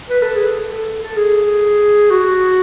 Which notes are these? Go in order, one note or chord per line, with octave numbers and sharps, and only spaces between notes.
B4
A4
G#4
A4
A4
G#4
F#4